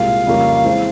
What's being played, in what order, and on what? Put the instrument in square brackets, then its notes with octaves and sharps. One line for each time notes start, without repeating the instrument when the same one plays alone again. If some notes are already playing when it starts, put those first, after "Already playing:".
Already playing: [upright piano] C2 A#2 G#3 [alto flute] F5
[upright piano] F2 C#3 G3 A#3 C#4
E3 G#3 C4